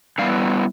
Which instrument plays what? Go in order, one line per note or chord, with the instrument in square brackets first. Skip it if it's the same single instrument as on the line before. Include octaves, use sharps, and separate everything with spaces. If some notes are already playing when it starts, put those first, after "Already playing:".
[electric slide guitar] D3 G3 B3 E4 F5